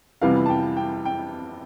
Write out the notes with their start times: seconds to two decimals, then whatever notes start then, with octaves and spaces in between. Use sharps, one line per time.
0.21 F2 C3 E3 G3 B3 F5
0.46 A5
0.50 G5
0.77 G5
1.05 G5